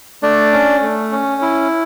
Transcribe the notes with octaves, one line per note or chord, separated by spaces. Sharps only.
A3 D4 D5
C#4
A3
C#4
E4